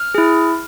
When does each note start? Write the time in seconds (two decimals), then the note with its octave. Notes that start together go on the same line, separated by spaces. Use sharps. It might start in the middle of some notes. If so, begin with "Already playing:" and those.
Already playing: F6
0.15 E4 G#4